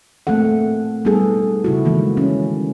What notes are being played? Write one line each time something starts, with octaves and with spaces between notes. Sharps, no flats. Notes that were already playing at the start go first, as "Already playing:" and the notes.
A3 A#3 C4 A4 F#5
G3 B3 D#4 G#4 A4
C#3 E4 F#4
D#3 E3 G#3 A#3
C#4